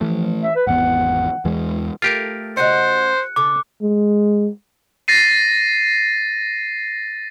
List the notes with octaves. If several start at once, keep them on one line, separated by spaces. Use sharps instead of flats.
E3 F3 A3
E5
B4
G#1 E2 B3 F#5
E2 E3 G#3
A3 F4 G4 A#4
C#3 F#4 C5 D#5 F#6 C#7
C#3 A4 D6
G#3
A6 A#6 C7 D#7